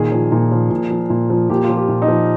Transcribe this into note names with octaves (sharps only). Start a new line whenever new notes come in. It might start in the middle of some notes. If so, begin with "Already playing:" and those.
Already playing: A#2 D#3 G#4
F3
A#2
F3
A#2
F3
A#2
F3
A#2 G4
F4
F3
G4
A#2
D#4
F3